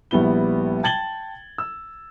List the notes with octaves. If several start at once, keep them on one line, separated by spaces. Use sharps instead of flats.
A#1 G3 B3 E4 G7
G5 A5 G#6 A6 F#7 G7
E6